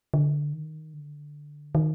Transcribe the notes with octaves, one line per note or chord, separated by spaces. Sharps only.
D3
D#3
D3
D#3